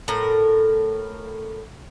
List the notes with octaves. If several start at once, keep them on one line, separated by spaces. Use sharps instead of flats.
A2 A#4